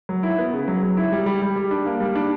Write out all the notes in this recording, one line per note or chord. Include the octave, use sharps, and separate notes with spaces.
F#3
E4
B3
C#3
F#3
F#3
E4
G3
G3
G3
G3
D4
A#3
G3
D4